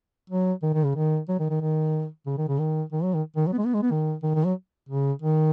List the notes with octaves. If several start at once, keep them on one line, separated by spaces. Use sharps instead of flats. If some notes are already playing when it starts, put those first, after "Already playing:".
F#3
D#3
D#3
C#3
D#3
F#3
D#3
D#3
D#3
C#3
D#3
C#3
D#3
D#3
F#3
D#3
D#3
F#3
B3
G#3
B3
G#3
B3
D#3
D#3
D#3
F#3
C#3
D#3